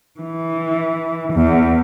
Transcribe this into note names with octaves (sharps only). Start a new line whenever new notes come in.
E3
E2